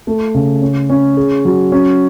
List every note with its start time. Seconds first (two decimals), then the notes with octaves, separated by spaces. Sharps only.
0.07 A3
0.35 C#3
0.62 C#4
0.90 C#4
1.17 G#4
1.45 F#3
1.72 C#4